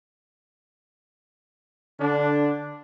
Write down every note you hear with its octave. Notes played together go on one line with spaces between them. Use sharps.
D3 D4